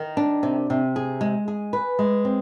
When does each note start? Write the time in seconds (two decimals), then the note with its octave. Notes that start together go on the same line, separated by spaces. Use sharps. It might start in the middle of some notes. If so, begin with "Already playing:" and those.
Already playing: D#3
0.17 D4
0.43 C3
0.70 C3
0.96 G#4
1.21 G#3
1.48 G#4
1.73 B4
1.99 G#3
2.25 C4